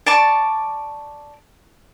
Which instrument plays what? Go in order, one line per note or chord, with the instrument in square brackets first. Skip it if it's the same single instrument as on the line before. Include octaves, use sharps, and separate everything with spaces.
[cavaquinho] D5 A5 C#6 D6